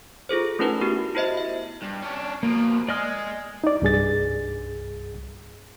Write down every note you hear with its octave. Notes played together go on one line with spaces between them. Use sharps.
F4 G#4 A4 C5
A3 C#4 D#4 E4 A#4 B4
B3 F#4 G4
E4 F#4 C5 D#5 E5
E5
G2
C#4 D4
B2 F3 A#3
G#3 G#4 D5 D#5 F6
D#4 D5
C2 G2 G#4 A6